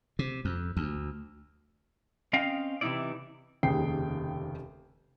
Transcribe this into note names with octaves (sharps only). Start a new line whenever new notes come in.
C3
F2
D2
C4 C#4 D#5 F5 G5
C3 E3 C#4 D#4 E4 D5
F1 D#2 C#3 G5 C7